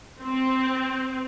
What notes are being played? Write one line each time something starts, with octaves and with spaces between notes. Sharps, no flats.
C4